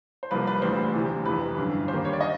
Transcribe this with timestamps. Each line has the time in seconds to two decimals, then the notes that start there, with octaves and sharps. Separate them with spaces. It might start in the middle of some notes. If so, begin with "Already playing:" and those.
0.23 C5
0.31 C2 C3 F3 A#3 B4
0.47 B4
0.62 A#1 A2 E3 G3 C5
0.94 D2 C3 E3
1.25 F2 C3 E3 B4
1.58 G1 F#2 D3
1.88 D#2 D3 G3 A#3 C5
2.05 C#5
2.13 D5
2.21 D#5